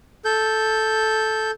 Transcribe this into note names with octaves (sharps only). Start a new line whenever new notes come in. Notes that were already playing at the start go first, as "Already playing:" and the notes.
A4 G6